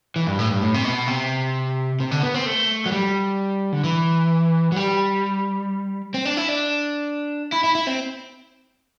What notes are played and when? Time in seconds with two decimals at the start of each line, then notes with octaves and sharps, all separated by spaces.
0.16 E3
0.27 G2
0.39 A2
0.51 G2
0.61 A2
0.74 C3
0.85 B2
1.07 C3
2.00 C3
2.11 D3
2.23 B3
2.34 C4
2.46 A3
2.86 F#3
2.92 G3
3.72 D3
3.84 E3
4.72 F#3
4.76 G3
6.14 C4
6.25 D4
6.37 E4
6.49 D4
7.52 E4
7.64 E4
7.75 E4
7.87 C4